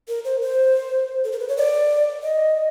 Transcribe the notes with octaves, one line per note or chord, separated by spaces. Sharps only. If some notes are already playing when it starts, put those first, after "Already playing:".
A#4
C5
C5
A4
A#4
B4
C#5
D5
D#5